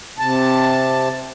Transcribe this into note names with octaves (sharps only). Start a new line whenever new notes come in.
C3 A5